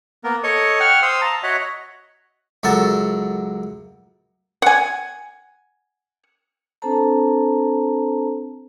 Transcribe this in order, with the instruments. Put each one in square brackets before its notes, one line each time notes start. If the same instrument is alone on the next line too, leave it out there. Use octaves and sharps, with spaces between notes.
[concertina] A#3 B3 A#4
A4 C#5 D#5 C#6 D#6
F#5 G5 C#6 F6
C5 F5 C6 D#6 E6
A5 A#5
F#4 C#5 D#5 E5 F#5
[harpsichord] C#2 F#2 A4 A#4 F#5 A5
[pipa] F#5 G#5
[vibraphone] C4 D4 A4 C5 A5 A#5